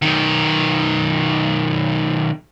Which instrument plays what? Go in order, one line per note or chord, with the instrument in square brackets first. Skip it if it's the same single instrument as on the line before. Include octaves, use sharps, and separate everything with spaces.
[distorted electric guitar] B1 D#3